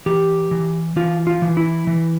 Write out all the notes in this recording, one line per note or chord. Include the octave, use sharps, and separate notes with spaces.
E3 G4
E3
E3 F4
F4
E3
E4
E3